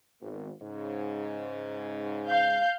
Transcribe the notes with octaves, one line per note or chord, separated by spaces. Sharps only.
G#1 B3
G#2 C#3
F5 G6